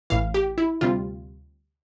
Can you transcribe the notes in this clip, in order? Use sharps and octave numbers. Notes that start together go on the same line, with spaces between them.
A1 A2 E3 F5
G4
E4
D2 C3 G3 C4 F4